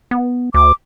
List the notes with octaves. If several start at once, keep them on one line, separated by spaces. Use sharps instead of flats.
B3
D2 D6